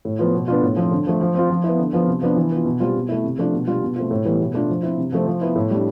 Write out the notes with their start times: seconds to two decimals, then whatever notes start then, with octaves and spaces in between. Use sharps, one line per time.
0.05 A2
0.19 F3 B3 F4
0.34 B2
0.48 B3 D4 F4
0.62 A2
0.76 F3 C4
0.91 D3
1.07 F3 A3
1.21 F3
1.35 C4 F4
1.50 F3
1.64 B3 E4
1.79 D3
1.93 F3 B3 F4
2.07 C3
2.22 F3 B3 D4
2.36 E3
2.51 B3 F4
2.65 B2
2.80 G3 C4 F4
2.95 B2
3.09 A3 E4
3.24 C3
3.38 F3 A3 D4 F4
3.53 B2
3.67 G3 D4 F4
3.82 B2
3.96 A3 C4 F4
4.11 A2
4.25 E3 G3 B3
4.40 B2
4.54 A3 D4 F4
4.69 F3
4.83 C4 E4
4.98 C3
5.12 F3 A3 C4
5.26 F3
5.41 B3 E4
5.56 A2
5.70 G3 D4